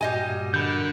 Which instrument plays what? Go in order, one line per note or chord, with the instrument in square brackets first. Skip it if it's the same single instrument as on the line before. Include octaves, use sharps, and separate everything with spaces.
[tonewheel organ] G2 A#2 F#4 [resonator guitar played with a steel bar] G3 D#5 G#5
[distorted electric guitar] D3 [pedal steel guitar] A#4 B5 G6